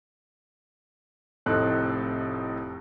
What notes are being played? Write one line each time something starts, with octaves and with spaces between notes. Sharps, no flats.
F1 A2 C4 D#4 A4 F#6